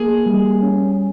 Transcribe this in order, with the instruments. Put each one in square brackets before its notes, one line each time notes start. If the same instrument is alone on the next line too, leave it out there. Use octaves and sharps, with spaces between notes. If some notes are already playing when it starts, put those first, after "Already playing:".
Already playing: [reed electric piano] A#3 [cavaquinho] G#4
[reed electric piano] G3
C#4